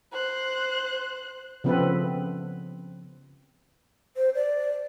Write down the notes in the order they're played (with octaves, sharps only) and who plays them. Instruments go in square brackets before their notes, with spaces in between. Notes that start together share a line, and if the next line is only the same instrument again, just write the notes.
[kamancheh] C5 F#6
[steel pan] C#3 F3 B3 C4 A4 B4
[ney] C5
D5